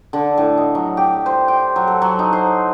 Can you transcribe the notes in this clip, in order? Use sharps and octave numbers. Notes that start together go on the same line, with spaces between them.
D3
A2
D#5
F#3
G4
C5
G5
F#3
A4
F#3
D#4
C5